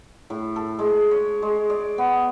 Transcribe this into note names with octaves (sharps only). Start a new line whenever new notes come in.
A2
A4
G#3
C#5
G#3
D5
B3